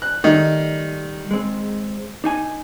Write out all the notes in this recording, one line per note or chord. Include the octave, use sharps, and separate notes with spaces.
F#6
D#3 G3 A3
G#3 C4
D4 D#4 G#5